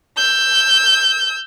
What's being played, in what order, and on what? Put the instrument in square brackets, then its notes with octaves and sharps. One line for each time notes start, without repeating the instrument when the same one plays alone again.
[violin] E6 G6